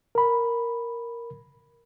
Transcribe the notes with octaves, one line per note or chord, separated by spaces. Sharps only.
A#4 B5